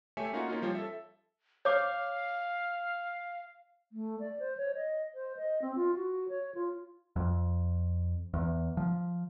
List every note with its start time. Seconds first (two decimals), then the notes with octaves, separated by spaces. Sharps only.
0.17 A3 G4 C#5 E5 G#5 C#7
0.33 A#3 C#4 D#4 F4 F#4
0.48 A#3 C#4 D#4 F4
0.62 F3 G3 F4 C#5
0.75 A4 E5
1.65 C#5 F5 D6
3.92 A3
4.20 D5
4.39 C5
4.57 C#5
4.75 D#5
5.14 C5
5.37 D#5
5.62 C4
5.76 F4
5.95 F#4
6.29 C#5
6.55 F4
7.16 F2
8.34 E2
8.77 F3